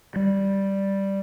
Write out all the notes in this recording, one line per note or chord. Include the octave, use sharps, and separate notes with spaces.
G3